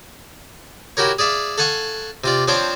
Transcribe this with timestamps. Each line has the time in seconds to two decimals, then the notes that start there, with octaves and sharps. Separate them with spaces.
0.97 E4 F#4 G4 A#4 C#5
1.19 G#4 D5 E5 F5
1.58 A4 F5 F#5 G#5 C#6
2.24 C3 F4 D5
2.48 F3 C4 D4 C5 C#5 D6